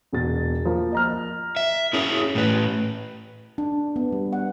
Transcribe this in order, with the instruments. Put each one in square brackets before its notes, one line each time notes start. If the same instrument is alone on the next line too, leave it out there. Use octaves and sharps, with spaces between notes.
[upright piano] E1 B2 A6
F3 A#3
D#5 A#5 F6
[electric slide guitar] E5
[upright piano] C#4 [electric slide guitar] E4 G#4 A#4
[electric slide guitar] A2 B4
[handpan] D4
B3
G3
F#5